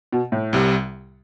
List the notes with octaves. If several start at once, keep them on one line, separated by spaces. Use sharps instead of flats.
B2
A2
C2 C3 G3